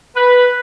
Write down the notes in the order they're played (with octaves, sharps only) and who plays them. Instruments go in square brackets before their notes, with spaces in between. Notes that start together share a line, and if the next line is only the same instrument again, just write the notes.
[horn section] B4